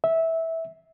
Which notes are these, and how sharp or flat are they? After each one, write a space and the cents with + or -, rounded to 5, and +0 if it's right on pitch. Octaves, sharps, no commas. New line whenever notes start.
E5 -15